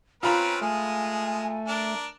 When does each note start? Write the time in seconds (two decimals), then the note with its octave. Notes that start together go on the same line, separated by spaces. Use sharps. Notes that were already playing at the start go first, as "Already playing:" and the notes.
0.23 C4 C#4 F4 B4 A#5 B5
0.62 G#3 A3 G#4 G#5
1.68 D4 A#4